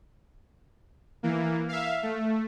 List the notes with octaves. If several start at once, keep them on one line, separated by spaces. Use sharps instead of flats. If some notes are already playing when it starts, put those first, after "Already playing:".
E3 A#3
E5 F5
A3